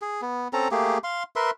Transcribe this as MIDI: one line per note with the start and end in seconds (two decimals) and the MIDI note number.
0.02 0.21 68
0.22 0.48 59
0.53 0.68 60
0.53 0.68 61
0.53 0.68 69
0.53 0.68 82
0.71 0.98 57
0.71 0.98 58
0.71 0.98 67
0.71 0.98 68
1.04 1.23 77
1.04 1.23 84
1.36 1.51 70
1.36 1.51 71
1.36 1.51 76
1.36 1.51 84